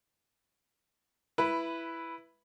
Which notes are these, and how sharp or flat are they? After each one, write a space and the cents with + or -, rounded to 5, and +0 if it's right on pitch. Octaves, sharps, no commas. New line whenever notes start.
E4 +10 B4 +0